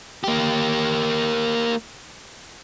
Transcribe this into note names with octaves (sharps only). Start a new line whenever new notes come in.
A#3 G4